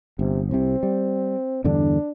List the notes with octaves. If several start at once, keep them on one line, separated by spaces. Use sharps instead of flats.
G1 C3
C2 C3 C4
G3
E2 G2 D3 D4